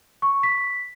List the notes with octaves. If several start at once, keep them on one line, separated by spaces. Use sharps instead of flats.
C#6
B6